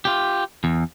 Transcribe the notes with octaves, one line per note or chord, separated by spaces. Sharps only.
F4 G4
E2